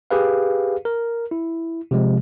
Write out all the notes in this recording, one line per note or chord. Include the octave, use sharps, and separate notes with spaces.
G4 G#4 B4 F5
A#4
E4
C3 F3 G#3